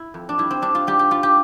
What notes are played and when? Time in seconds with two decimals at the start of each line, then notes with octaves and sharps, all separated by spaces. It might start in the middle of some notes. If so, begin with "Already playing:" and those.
Already playing: E4
0.14 F2
0.29 D4
0.38 G3 E4
0.50 C4
0.62 G3 D4
0.75 F4
0.87 G3 G4
0.99 G4
1.11 G3 F4
1.23 G4